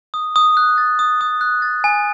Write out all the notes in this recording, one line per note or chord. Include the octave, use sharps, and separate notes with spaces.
D#6
D#6
F#6
A6
D#6
D#6
F#6
A6
G#5